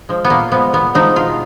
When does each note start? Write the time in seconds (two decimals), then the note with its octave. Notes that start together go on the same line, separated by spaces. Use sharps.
0.09 F3 G#3
0.25 B3
0.30 A#2 A#3
0.52 F3 G#3 B3
0.73 A#2 B3
0.95 F3 G#3 D#4
1.16 B2 F4